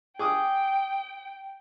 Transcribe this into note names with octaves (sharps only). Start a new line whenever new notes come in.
G#4 G5 D6 D#6